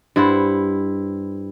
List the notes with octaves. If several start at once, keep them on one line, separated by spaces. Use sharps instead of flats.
G2 E4 C5 F#5